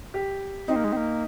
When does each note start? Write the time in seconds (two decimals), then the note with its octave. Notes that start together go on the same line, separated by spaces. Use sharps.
0.14 G4
0.68 C4 D#4
0.76 A#3
0.84 G#3
0.93 C4
0.97 A#3